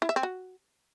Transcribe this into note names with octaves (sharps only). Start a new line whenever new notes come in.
E4
E5
C4
F#4